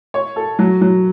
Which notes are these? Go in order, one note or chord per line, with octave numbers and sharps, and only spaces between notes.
C#5
A4
F#3
F#3